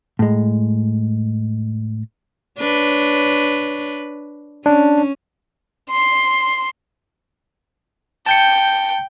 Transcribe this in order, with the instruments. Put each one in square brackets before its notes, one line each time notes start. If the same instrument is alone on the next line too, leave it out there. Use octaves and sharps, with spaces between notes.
[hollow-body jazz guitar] A2 G#3
[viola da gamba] D4 B4 C#5
[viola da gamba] C#4 [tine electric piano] D4
[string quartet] C6
[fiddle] G5 [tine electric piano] A5 G6 C#7